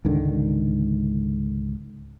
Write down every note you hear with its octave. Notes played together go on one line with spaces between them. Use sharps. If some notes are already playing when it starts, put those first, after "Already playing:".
C#2 G#2 D3 D#3